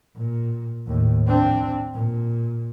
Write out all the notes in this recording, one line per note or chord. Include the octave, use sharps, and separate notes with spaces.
A#2
D#2 A2
C4 D4
A#2